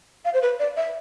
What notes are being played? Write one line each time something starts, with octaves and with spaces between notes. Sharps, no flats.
F5
C5
B4
D5
E5